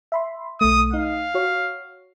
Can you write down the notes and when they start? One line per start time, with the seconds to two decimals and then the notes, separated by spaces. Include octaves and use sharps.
0.12 E5 B5 C6
0.61 B1 A3 D#6
0.93 D#4 F5
1.34 F#4 C#5